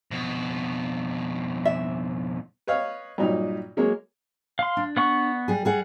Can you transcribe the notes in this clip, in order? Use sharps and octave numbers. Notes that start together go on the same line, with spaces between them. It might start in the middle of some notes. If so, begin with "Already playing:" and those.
F2 B2
E5
B4 C#5 D#5 F5
G2 A#2 F#3 D#4
F#3 G#3 A#3 G#4 C#5
F5 C6
D4
B3 F#5 C#6
G3 G#4
G3 G#4 F#5